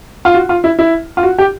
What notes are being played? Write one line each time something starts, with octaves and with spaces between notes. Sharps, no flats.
F4
F#4
F4
E4
E4
F4
F#4
G4